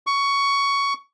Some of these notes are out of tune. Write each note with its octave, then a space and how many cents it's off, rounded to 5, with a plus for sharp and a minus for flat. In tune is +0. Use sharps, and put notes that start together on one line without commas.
C#6 +15